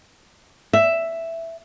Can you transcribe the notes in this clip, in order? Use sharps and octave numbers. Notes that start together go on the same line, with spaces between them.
E5